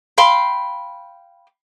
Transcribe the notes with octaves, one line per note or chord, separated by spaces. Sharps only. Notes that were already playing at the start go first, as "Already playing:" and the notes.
F5 G5 B5 C6